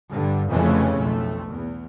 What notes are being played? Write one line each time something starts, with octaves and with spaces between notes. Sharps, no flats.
G2 D3
F1 F2 C#3 E3 A3 C#4
B1 F2 A3
E2